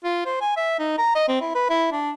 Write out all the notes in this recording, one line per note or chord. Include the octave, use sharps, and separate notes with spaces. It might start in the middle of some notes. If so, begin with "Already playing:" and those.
F4
C5
G#5
E5
D#4
A#5
D#5
C4
E4
B4
E4
D4